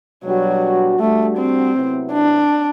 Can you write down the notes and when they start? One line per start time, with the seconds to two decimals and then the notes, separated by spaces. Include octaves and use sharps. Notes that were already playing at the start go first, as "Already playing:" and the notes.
0.24 B2 F#3 G3 D4 F#4
0.99 G3 A3 D4 F#4
1.37 C4
1.74 C3 F#3 B3 E4
2.12 D4